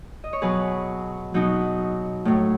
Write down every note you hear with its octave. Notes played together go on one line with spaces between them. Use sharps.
D#5
C#5
B2 F#3 G#4 B4
B2 F#3 D#4
A2 F#3